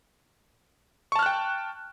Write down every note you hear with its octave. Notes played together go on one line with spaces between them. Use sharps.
G5 A5 C#6 F6 F#6